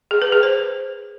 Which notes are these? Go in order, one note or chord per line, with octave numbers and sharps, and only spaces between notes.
G#4
B4
G#4
C5